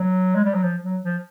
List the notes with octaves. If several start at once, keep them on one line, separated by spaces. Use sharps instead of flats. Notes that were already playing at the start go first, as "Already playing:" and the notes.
Already playing: F#3
G#3
G3
F#3
F3
F#3
F3